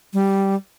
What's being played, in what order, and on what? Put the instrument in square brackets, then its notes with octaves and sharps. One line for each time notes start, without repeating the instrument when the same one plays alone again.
[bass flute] G3